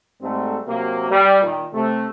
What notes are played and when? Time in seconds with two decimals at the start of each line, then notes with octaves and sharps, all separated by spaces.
0.22 G#2 G3 A3 C4 A4
0.68 C3 F#3 A#3
1.10 G3
1.42 A#2 D#3
1.73 C3 A3